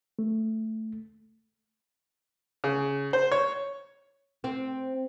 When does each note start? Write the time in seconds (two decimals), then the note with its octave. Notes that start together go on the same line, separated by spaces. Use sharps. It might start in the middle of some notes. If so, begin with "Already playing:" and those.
0.19 A3
2.64 C#3
3.13 C5
3.32 C#5
4.44 C4